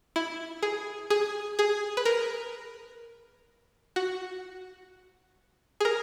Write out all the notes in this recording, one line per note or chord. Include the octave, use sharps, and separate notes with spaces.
E4
G#4
G#4
G#4
B4
A#4
F#4
G#4
A#4